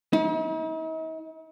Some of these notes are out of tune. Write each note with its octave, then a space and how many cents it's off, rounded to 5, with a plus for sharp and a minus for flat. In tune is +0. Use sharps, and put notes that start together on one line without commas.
D#4 +45